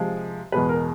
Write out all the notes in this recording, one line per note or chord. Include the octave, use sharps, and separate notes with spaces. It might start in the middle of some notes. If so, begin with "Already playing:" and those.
Already playing: C3 F3 G#3
E2 B2 G#3 B4
A#4